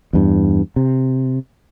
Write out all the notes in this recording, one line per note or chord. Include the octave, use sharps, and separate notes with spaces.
E2 G2
C3